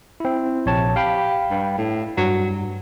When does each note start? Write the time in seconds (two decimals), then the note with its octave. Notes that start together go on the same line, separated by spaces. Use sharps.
0.20 C4 E4
0.66 A#1 C3 C#5 A5
0.96 G4 F5 G5 B5
1.51 G2
1.78 A2
2.18 G2 F#3